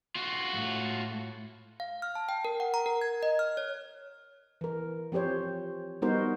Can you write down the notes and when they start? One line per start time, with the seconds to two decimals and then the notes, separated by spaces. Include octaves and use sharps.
0.15 F4 F#4
0.55 A2
1.80 F5
2.02 F6
2.15 A5
2.29 G5
2.45 A#4
2.60 F#5
2.74 A#5
2.86 A#4
3.01 G#6
3.23 D#5
3.39 F6
3.57 C#5
4.61 E3 A#4
5.12 F3 C4 G4 C5 C#5
6.02 G3 B3 D#4 F#4 A#4 C5